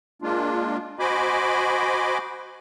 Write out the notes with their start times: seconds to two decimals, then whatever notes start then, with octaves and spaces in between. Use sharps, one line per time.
0.22 G#3 A#3 D4 F4
0.99 F#4 C5 D#5 G#5 B5 D6